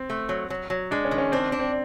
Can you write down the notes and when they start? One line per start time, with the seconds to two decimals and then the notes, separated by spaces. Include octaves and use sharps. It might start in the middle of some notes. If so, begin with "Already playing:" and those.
Already playing: C4
0.10 A3
0.29 F#3
0.50 F#3
0.70 F#3
0.91 G#3 D4
1.05 C#4
1.11 D#3
1.18 C#4
1.32 C4 D4
1.52 D4
1.60 C4